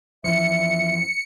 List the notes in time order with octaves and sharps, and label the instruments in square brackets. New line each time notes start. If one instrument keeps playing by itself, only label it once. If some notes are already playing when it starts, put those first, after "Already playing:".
[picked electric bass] F#2 E3 F3 [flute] E5 [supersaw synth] C#7